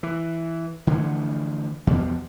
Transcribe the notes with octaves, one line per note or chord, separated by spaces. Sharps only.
E3
D3 E3 F3 A3
E2 B2 F3 G3